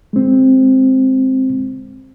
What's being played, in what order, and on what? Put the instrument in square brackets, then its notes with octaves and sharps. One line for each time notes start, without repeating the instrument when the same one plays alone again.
[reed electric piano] G#3 C4